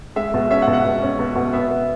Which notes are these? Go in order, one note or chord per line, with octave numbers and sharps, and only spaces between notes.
G#3 E5
B2
C#4 E5
F#5
B2
F#5
B2
C#4
B2
B2
B3 E5
B3